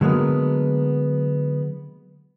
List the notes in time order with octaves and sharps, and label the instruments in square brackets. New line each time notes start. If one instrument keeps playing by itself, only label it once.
[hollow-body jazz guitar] D3 F#3 G#3 A#3 B3